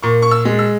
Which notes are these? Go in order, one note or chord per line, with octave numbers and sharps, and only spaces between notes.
A#2 C#6
C#6
E6
G#3
E6